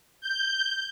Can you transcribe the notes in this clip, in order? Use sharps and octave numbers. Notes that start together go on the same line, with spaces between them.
G6